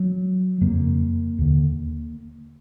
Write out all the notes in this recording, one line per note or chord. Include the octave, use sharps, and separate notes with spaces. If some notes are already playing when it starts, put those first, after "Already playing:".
Already playing: F#3
F2 C#3 A#3
D#2 D3